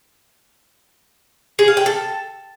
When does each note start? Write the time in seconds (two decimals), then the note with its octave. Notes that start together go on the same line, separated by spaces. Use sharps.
1.59 G#4
1.68 F5
1.77 G5
1.86 A4